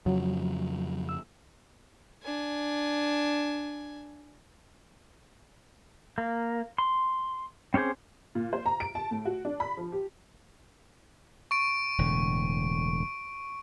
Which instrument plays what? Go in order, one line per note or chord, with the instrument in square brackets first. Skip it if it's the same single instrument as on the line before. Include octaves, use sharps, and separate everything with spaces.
[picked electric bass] F2 C#3 F3 [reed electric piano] F#3
[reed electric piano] E6
[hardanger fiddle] D4 G#5
[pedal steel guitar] A#3
C6
C4 C#4 G4 G#4 C5
[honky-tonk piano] A#2
C5
A#5
D7
A5
A2
F#4
D4
B5
F3
G4
[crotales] C#6 D7
[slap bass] E1 A2 D3